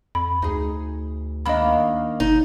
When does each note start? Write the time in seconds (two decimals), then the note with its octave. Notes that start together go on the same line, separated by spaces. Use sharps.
0.15 F2 B5
0.42 D2 D#4 G#4
1.46 D#3 A#3 D4 D#5 B5
2.20 G1 D#4